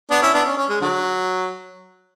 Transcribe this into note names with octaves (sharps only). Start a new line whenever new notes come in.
B3 D4
C#4 E4
B3 D4
C#4
C#4
G#3
D3 F#3